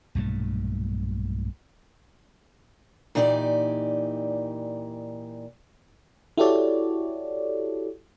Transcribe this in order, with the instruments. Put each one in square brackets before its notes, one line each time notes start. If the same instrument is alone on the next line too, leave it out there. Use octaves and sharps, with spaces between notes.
[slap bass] B1 G2 A#2 A3
[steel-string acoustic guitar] A#2 E3 D#4 G4 C#5 D5
[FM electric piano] E4 F#4 G4 A4 C#5 D5